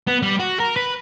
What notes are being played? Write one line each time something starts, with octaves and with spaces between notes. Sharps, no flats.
B3
G3
F#4
A#4
B4